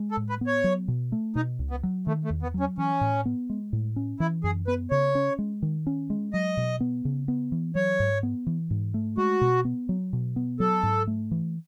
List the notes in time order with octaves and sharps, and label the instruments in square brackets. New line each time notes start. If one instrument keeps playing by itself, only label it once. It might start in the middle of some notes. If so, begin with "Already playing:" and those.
Already playing: [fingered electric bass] G#3
[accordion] A4
[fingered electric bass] A2
[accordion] B4
[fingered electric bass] B3
[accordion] C#5
[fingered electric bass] F#3
B2
A3
[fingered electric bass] B2 [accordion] D#4
[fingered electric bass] C#2
[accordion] B3
[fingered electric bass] F#3
[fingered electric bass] D#3 [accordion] A3
[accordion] A3
[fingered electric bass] E2
[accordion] B3
[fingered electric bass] F#3
[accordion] C#4
[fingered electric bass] E3 [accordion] C#4
[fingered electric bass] A2
B3
G#3
A2
C#4
[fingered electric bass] E3 [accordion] E4
[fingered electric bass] F#2 [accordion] G#4
[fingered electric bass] B3 [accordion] B4
[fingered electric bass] C#3 [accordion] C#5
[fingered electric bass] C#4
G#3
D#3
C#4
G#3
[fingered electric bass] F#3 [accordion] D#5
[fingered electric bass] B2
B3
C#3
B3
E3
[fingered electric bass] F#3 [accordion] C#5
[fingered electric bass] G#2
B3
E3
G#2
A3
[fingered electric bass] G#3 [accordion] F#4
[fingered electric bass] B2
B3
F#3
B2
B3
[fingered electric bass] F#3 [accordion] A4
[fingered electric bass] G#2
A3
E3